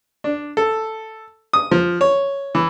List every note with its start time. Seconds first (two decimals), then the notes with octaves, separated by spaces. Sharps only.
0.24 D4
0.57 A4
1.53 D#6
1.71 F3
2.01 C#5
2.55 E3